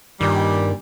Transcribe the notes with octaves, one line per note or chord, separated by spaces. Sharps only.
G2 A#2 D#3 G3